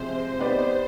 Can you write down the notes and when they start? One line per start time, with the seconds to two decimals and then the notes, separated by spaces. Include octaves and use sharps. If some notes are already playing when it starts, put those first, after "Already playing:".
Already playing: C3 F3 G#3 C5
0.39 B3 D#4 G4 B4 C5 D5